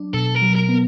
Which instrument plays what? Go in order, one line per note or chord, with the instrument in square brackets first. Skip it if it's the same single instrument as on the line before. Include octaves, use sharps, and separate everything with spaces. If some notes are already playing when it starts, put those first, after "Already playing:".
Already playing: [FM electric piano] F#3 D4
[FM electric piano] B2 [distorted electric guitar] A4
[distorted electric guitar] A#4
[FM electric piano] F#3
[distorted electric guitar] A#4
[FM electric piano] B3